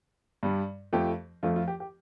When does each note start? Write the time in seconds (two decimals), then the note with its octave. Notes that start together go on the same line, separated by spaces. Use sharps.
0.43 G2 G3
0.93 F2 F3 A3 G4
1.43 F2 F3 A3 F4
1.56 F4
1.68 G4
1.80 G4